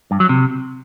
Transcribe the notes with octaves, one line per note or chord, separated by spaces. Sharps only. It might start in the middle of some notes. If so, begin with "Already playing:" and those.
G2
F#3
C3